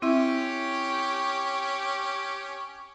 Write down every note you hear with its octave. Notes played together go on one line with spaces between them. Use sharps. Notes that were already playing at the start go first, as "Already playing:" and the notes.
C4 C#4 E4 G4 C#5 E5